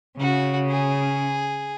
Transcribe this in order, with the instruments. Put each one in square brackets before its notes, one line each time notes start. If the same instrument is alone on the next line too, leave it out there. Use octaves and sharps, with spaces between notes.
[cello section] C#3 [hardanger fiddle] F#4
[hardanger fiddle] G#4